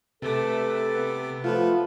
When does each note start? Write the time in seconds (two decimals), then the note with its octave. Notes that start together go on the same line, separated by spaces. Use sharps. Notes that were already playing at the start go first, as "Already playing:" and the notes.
0.22 C3 A3 A4 B4 D6
0.92 B3
1.44 F3 A3 F4 A4 B4